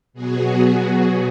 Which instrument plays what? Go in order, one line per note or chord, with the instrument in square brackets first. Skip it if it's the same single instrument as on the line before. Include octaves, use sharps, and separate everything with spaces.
[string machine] B2 F#3 B3 F#4 G#4